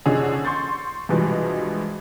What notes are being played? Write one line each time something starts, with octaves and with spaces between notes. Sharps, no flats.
D3 F3 C#4 D#4 G#4
C6 C#6 G6 A6
G2 B2 E3 F3 G#3